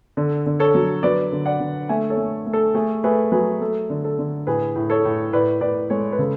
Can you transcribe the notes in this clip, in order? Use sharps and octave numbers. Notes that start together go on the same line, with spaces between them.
D3 A4
D3
A4 C#5
F#3
F#3 B4 D5
D3
D5 F#5
D3
A3 E5 G#5
A4 C#5
A3
A3
A4
A3 G#4
A3 G#4 B4
F#3 G#4 B4
A3 A4
D3
A4
D3
A2 G#4 B4
A2
A4 C#5
A2
A2 B4 D5
A2 B4 D5
G#3 A4 C#5
B4
C#3 A4